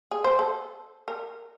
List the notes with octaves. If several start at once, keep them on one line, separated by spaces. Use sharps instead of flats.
G#4
C5
A4
A#4